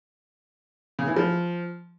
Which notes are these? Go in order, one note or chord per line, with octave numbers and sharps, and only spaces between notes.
C#3
E3
F3